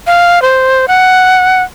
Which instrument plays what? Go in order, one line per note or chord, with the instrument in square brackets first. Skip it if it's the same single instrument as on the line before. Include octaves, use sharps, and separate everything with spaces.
[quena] F5
C5
F#5